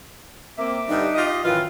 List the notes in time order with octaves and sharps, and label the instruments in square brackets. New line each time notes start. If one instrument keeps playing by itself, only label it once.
[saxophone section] A#3 C4 [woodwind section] E5 D6
[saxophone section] G2 D3 G3 [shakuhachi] D#4
[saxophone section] F4 G4 D#5
[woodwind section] F#2 A2 D#3 [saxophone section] E3 F4 [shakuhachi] B4